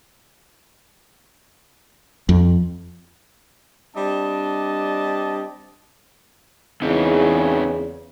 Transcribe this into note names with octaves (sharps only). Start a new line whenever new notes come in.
F2
G3 C4 D4 D5 D#5 A5
E2 C#3 C4 D#4